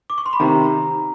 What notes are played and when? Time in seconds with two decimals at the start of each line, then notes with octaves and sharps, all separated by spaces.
0.10 D6
0.18 C#6
0.26 C6
0.33 B5
0.40 C3 D#3 A#5